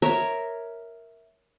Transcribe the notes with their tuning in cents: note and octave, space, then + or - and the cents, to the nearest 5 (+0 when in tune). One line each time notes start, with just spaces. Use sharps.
A#4 +0 C#5 +0 E5 -10